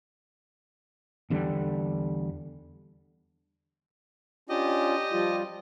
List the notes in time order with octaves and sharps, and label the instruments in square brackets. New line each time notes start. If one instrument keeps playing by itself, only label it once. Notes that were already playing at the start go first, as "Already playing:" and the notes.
[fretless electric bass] E2 D3 G3
[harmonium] C#4 D4 F4 [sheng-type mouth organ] G4 D#5
[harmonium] F3 G3 F4